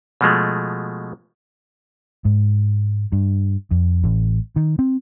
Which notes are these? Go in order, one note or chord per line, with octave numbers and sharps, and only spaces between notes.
B2 F3 G#3 A3
G#2
G2
F2
A1
D#3
C4